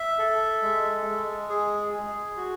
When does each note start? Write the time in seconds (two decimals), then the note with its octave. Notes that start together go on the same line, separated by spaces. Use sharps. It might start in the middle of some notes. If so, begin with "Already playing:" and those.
Already playing: E5
0.19 A4
0.62 G#3
1.06 G#3
1.49 G#4
1.93 G#4
2.37 F#4